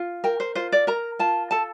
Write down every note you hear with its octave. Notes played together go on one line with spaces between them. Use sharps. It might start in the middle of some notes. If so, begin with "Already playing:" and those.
Already playing: F4
A#4 G5
C5
F4 C5
D5
A#4 A#5
F4 A5
A4 A5